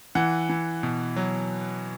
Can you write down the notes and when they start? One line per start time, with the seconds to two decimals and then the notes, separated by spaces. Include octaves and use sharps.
0.15 E3 F#5
0.49 E3
0.83 B2
1.16 F#3